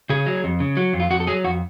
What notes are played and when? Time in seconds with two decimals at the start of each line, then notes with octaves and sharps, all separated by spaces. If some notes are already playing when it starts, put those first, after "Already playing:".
0.10 C#3 G#4
0.26 F#3
0.44 F2
0.60 C#3
0.77 F#3
0.93 F2
1.00 F4
1.11 F2 F#4
1.20 A4
1.27 F#3 G#4
1.44 F2 F#4